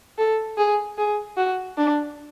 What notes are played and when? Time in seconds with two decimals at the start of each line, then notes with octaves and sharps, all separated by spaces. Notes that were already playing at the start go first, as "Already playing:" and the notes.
0.18 A4
0.58 G#4
0.98 G#4
1.37 F#4
1.77 D4